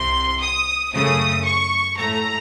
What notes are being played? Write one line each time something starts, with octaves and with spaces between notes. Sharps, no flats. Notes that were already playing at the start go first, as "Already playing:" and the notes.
Already playing: C2 C3 C6
D#6
F#2 C#3 A3 D#6
C#6
A2 A3 A#5